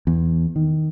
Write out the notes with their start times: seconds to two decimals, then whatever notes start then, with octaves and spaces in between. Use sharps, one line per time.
0.07 E2
0.56 D#3